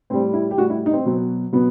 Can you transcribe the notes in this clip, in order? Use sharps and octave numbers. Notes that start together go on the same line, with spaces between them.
A2 G3 C4
E4
G4
A2 G3 F#4
E4
D#4
C4
B2 F#3
B2 F#3 B3